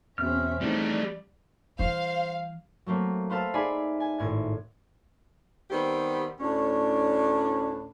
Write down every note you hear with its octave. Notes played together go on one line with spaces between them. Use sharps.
E2 B2 C4 C#4 E5 F6
E3 G3 A3 C4 D#4 D5
E3 G3 C5 F5
F#3 A3 A#3 C4
B4 C5 F5 A5 E6
D#4 G#4 D5 E5 G#5 B5
G#5
G#1 A2 G#6
D#3 G3 B3 C4 G4 B4
D2 A2 C#4 D4